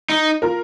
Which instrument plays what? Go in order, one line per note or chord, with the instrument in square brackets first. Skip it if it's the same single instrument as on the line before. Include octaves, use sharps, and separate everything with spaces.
[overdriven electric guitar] D#4
[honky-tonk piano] F4 A#4